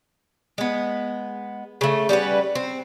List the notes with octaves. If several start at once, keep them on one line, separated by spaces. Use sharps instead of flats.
G#3 B3
C#3 A3
G3 B3 C#4 B4
C4